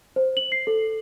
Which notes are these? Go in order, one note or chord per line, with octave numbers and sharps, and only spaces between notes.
C5
F#7
C7
A4